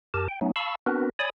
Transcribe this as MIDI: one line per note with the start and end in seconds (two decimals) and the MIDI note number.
0.14 0.28 42
0.14 0.28 67
0.14 0.28 70
0.14 0.28 81
0.28 0.39 79
0.41 0.51 54
0.41 0.51 57
0.41 0.51 59
0.41 0.51 61
0.41 0.51 63
0.56 0.75 77
0.56 0.75 81
0.56 0.75 83
0.56 0.75 85
0.56 0.75 88
0.86 1.10 59
0.86 1.10 60
0.86 1.10 62
0.86 1.10 66
0.86 1.10 70
0.86 1.10 71
1.19 1.30 73
1.19 1.30 74
1.19 1.30 80
1.19 1.30 83
1.19 1.30 87